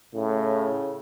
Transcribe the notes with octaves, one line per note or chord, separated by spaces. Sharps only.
A2 C#3